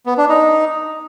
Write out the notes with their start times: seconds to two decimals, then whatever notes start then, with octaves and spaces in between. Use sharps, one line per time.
0.06 B3
0.18 D4
0.29 D#4